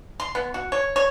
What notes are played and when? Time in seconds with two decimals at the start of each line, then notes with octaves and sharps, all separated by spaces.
0.20 C6
0.35 B3
0.54 F#4
0.72 C#5
0.96 C#5